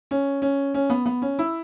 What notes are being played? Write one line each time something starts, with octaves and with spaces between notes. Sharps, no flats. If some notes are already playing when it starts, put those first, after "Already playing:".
C#4
C#4
C#4
B3
B3
C#4
E4